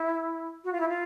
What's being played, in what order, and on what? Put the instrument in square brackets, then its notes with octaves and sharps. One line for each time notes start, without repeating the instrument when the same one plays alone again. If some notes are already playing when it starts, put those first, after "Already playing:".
Already playing: [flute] E4
F#4
F4
E4
F4